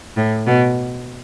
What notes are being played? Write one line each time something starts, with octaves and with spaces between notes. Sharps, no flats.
A2
B2